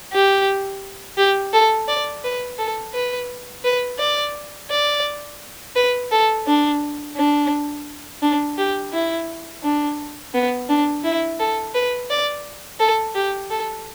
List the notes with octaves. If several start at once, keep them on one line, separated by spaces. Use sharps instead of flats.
G4
G4
A4
D5
B4
A4
B4
B4
D5
D5
B4
A4
D4
D4
D4
G4
E4
D4
B3
D4
E4
A4
B4
D5
A4
G4
A4